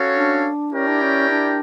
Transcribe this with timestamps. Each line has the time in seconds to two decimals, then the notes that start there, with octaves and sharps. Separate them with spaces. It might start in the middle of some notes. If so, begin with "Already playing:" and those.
Already playing: C#4 F#4 A4 C#5 F5
0.15 D4
0.72 C#4 E4 G4 A#4 D5 G5
0.87 D4
1.01 C#4
1.29 D4